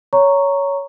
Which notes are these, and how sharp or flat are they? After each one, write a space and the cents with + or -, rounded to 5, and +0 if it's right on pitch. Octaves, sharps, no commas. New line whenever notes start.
C#5 +15 A#5 -5 C#6 +0